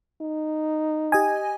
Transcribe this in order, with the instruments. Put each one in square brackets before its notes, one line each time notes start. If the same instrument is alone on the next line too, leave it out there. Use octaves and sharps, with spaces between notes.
[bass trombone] D#4
[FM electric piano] G4 D#5 G#5